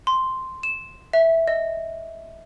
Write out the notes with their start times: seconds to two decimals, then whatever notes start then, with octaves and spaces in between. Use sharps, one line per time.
0.07 C6
0.63 E7
1.13 E5
1.48 D#5